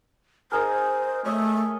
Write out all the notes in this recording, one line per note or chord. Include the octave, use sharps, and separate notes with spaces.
D#4 G#4 A#4 C5
A3 C#5 D#5 E5